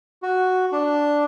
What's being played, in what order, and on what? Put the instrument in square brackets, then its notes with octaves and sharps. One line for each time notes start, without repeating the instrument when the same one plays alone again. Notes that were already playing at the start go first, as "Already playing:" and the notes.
[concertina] F#4
D4